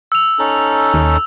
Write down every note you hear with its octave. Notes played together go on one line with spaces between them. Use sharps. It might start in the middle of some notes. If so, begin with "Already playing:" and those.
E6 F7
C#4 D#4 A4
D#2